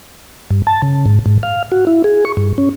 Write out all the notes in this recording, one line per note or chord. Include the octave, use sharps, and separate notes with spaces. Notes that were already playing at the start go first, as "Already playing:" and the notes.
G2
A5
C#3
G#2
G#2
F5
F#4
E4
G#4
C#6
G2
C#4